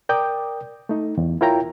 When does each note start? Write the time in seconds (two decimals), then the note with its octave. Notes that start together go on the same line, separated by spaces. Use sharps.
0.09 A#4 D5 G5 D6 D#6 G6
0.89 A3 D#4
1.17 E2
1.41 E4 F4 A#4 C#5 G5 A#5